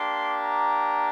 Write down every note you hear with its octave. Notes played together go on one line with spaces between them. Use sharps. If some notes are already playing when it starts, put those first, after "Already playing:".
Already playing: A#3 D4 G4 C6
A#5